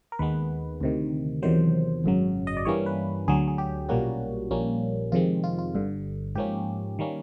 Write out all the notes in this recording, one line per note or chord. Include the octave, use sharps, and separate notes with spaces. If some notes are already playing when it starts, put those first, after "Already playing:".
A#4
D#2 D#3 G#3 B3 B4
D2 C3 D#3
E2 C3 D#3 F#3 C5
G#1 F#2 C#3 F#3
D#5
D5
G2 E3 G3 A#3 C#4 C#5
B4
D2 D3 F#3 G#4
G#4
G4
B1 A#2 G3 A#3 C#4 F#4
A#1 A#2 G3 A#3 C#4
F2 C3 D#3 G#3 C4 F4
F4
F4
G1 G2 D3
G#2 F3 A#3 C#4 G4
D#3 G3 A#3 C#4